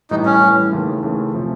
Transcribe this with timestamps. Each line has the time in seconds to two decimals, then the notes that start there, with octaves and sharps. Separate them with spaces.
0.10 A2 E3 G3 D#4
0.25 C#4
0.41 A2 E3 G3
0.72 D#2 C#3 E3 A3
1.03 D#2 C#3 E3 A3
1.34 C3 F3 A3 C#4